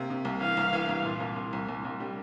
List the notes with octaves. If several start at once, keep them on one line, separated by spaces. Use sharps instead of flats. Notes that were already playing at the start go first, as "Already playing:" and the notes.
Already playing: C3 A#3
C3
C2
E3 F5
C2
E3
C2
A#2
C2
C2
C2
C2
C2
G3